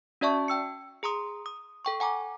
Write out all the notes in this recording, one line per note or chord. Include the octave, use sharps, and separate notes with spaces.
C#4 F#4 D5 E5 A5 C#6
G5 E6 C#7
G#4 A#5 C6 D#6
D#6
A4 G5 C#6
F#5 G#5 A#5 D6